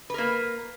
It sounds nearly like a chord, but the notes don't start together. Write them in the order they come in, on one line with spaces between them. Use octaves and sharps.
B4 A#4 A#3